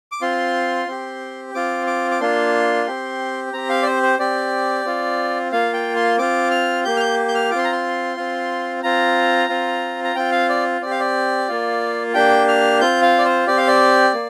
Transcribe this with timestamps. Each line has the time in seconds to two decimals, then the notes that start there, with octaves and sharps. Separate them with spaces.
0.12 D6
0.21 C4 F4 C6
0.87 C4 G4
1.54 C4 F4 D6
1.87 D6
2.11 D6
2.21 A#3 D4 F4 C6
2.87 C4 G4
3.53 C4 G4 A#5
3.69 F5
3.82 D5
3.86 C5
4.03 C5
4.19 C4 G4 D5
4.85 C4 F4
5.52 A#3 F4 F5
5.74 G5
5.96 C6
6.18 C4 F4 D6
6.51 F6
6.85 A#3 G4 G6
6.97 F6
7.00 G6
7.28 G6
7.35 F6
7.51 F4 D6
7.55 C4 C6
7.64 A#5
7.72 C6
8.17 C4 F4
8.83 C4 F4 A#5
9.49 C4 F4
10.04 A#5
10.16 C4 F4 G5
10.32 F5
10.49 D5
10.81 C4 G4 D5
10.91 F5
11.00 D5
11.48 A#3 F4
12.14 A#3 D4 G4 G5
12.48 F6
12.81 C4 F4 G6
13.02 F5
13.18 D5
13.25 C5
13.47 C4 G4 D5
13.57 F5
13.67 D5
14.14 A#3